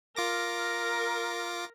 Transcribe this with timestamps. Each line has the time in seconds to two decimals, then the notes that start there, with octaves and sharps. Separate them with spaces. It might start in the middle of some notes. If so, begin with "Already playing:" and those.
0.16 F4 A#4 D6 A#6